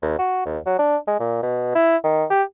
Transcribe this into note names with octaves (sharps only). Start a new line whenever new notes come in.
D#2
F#4
D#2
F#3
D4
G#3
A#2
B2
E4
D#3
G4